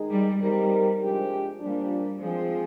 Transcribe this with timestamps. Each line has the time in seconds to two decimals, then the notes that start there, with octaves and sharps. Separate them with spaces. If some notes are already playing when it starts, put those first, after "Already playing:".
Already playing: D#3 G#3 D#4 G#4
0.10 G3
0.40 G3 C4 D#4 G4 A#4
1.00 C3 F3 G#3 D4 G4
1.60 A#2 F3 G3 A#3 D4
2.20 F3 G#3 C4 F4 G#4 C5